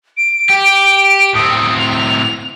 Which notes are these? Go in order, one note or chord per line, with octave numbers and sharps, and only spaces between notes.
D7
G4
A2 C4 D#6
F7